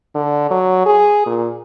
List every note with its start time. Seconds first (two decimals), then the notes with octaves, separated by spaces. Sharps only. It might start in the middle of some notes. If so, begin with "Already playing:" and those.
0.15 D3
0.51 F#3
0.86 G#4
1.26 A#2